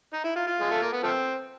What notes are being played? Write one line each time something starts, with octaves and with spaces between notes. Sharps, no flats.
D#4
E4
F4
F4
G#3
A3
A#3
B3
F3 A3 C4